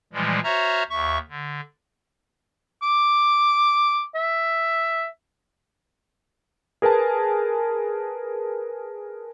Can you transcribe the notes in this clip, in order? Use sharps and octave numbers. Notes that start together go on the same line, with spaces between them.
A#2 E3 F3 G3 G#3
F#4 C5 C#5 E5 A#5 F6
D#2 E5 C#6
D3
D6
E5
G#4 A#4 B4 G#5 A5